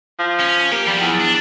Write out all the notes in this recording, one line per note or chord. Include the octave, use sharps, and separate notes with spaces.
F3
C#4
A#3 G4
F3 G3 B3
E2
D4